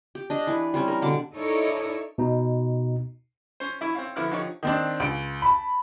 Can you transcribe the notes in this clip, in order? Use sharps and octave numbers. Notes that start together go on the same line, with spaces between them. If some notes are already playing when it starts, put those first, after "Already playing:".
G4
D4 D#5
E3 B4
G3 C4 C#4
A#4
B2 D3 D6
D#4 E4 A4 A#4 C#5 D5
B2 D#4
C#4 C5
C#4 E4 E5
C4 C#5 F5
D3 F3 B3 E4 D6 F6
D3 F3 D#4 G4 C#5
D#3 C4 D4
C#2 D7
A5 B5